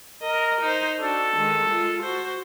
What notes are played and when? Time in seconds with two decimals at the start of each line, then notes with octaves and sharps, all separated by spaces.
0.22 A#4 D#5
0.61 D#4 C5
0.99 D4 F#4 A4
1.37 D#3 G#3
1.69 G#3 F4
2.02 F#4 C5